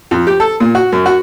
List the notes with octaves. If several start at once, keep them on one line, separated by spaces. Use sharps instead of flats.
F2
G4
A4
A#2
F#4
F#2
F#4